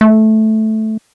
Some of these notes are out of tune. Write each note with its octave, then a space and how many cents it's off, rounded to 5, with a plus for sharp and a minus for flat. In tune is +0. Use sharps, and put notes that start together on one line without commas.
A3 -10